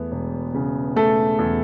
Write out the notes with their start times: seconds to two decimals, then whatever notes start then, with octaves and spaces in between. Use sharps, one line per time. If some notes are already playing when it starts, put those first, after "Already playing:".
Already playing: E2 A3 B3
0.12 E1
0.54 C#3
0.96 A3 A4
1.39 E2